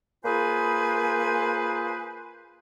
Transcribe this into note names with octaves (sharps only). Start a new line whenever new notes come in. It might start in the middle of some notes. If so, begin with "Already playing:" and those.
A#3 F4 G#4 B4 C5 G#5